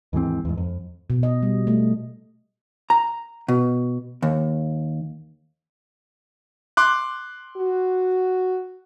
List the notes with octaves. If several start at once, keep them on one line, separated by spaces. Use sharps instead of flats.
D#2 G#2 E3 C4
E2 G#2
F2
B2
D#5
G3
A3
A#5
B2
D#2
C6 D6 F#6
F#4